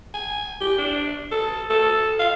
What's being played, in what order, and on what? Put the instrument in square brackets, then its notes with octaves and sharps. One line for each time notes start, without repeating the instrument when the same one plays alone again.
[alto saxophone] G#5
G4
D4
A4
A4
F5